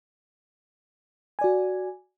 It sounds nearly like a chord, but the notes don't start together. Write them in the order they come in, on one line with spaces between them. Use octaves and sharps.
G#5 D5 F#4